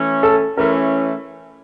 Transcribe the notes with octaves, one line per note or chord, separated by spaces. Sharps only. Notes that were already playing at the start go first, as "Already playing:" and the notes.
Already playing: E3 A3 C#4
A4
E3 A3 C#4 A#4